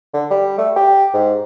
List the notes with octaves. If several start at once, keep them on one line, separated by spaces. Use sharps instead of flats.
D3
G3
A3
G4
G#2